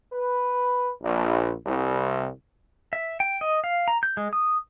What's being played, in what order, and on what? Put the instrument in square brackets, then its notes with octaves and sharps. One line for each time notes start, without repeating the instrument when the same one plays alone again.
[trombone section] B4
A#1
C2
[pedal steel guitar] E5
G5
D#5
F5
A#5
G6
G#3
D#6